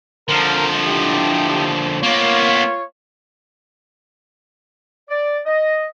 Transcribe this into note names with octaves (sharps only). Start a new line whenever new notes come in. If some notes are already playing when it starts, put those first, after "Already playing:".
D3 F3 A#4
D#4 E4 G4
A#3 B3 F4 C#5
D5
D#5